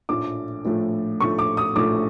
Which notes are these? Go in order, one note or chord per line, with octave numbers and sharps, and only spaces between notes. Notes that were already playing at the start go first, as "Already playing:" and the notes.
A#1 A2 F3 A3 D6
A#1 A2 F3 A3
A#1 A2 F3 A3 C#6
D6
D#6
A#1 A2 F3 A3 D6